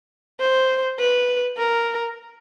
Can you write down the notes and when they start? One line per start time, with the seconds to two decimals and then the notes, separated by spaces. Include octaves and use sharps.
0.40 C5
0.99 B4
1.57 A#4